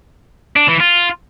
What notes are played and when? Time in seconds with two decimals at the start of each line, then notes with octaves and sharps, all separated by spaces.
0.56 D4
0.68 E3
0.80 F4